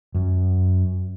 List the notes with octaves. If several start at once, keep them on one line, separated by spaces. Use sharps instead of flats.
F#2